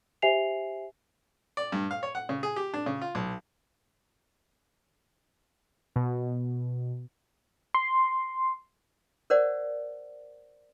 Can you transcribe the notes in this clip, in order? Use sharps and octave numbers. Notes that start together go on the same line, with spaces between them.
G4 C5 E5 G#5 C7 F7
D5
G2
F5
C#5
F#5
C#3
G#4
G4
D4
C#3
F4
B1
B2
C6
A#4 C5 D5 F#5